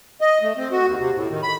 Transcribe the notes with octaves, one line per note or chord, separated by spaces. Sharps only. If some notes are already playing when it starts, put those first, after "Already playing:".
D#5
A3
C4
F#4
D#2
C3
A2
D#3
B5